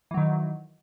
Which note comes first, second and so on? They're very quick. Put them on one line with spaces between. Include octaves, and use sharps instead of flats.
E3 F#3 D#3